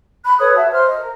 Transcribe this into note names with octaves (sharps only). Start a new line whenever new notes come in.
B5 F#6
A4 B4 C#5 D#6
F#4 E5 A5
C5 F6
D#5
A#4